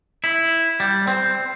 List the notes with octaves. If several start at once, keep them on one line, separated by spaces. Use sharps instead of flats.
E4
G3
C4